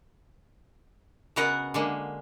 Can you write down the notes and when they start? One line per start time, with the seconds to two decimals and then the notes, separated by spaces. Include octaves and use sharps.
1.36 C#3 B3 F#4 A#4 D#5 F#5
1.74 D3 G#3 A#3